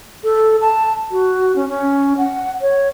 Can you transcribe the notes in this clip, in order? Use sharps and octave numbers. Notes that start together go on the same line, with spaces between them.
A4
A5
F#4
C#4
C#4
F#5
C#5